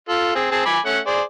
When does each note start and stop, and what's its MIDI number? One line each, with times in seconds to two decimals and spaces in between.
0.09 0.34 65
0.09 0.34 69
0.35 0.50 60
0.35 0.50 68
0.51 0.61 60
0.51 0.61 68
0.51 0.61 81
0.66 0.79 80
0.66 0.79 83
0.66 0.79 86
0.86 0.99 57
0.86 0.99 61
0.86 0.99 78
1.07 1.21 68
1.07 1.21 72
1.07 1.21 74